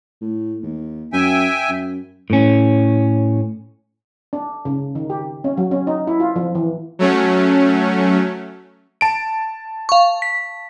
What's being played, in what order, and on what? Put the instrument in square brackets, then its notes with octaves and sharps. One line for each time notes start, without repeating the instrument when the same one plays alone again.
[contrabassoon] A2
D#2
[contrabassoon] F#2 [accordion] E5 G5 G#5
[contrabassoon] F#2
[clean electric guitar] A2 C#4
[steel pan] D4
C#3
D#3
G4
C#4
F#3
C#4
D#4
E4
F4
F3
E3
[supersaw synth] F#3 A3 C#4
[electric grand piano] A5 D7
[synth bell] F5 C#6
B6